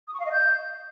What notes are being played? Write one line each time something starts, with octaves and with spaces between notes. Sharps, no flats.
D#6
C#6
F5
D#5
G6